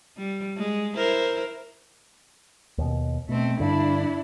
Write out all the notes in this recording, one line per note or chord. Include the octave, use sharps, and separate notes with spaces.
G3
G#3
E4 A#4 C5
D#2 B2
B2 A3 C4
G2 D3 D4 E4